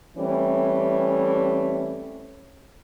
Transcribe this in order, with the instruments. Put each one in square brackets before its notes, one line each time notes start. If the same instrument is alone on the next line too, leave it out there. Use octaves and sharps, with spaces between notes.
[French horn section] E3 G3 A3 C4 C#4